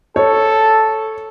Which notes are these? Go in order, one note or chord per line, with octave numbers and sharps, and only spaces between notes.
A4 C#5